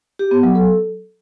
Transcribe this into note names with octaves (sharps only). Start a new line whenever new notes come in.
G4
B3
F#3
A4